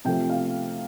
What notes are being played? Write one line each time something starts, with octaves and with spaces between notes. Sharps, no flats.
C3 F3 A3 G5
F5